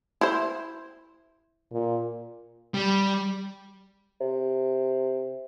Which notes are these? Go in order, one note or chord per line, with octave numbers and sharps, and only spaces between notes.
E4 C5
A#2
G3
C3